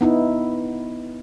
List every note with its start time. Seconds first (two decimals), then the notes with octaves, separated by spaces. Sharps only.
0.01 B3 D#4 E4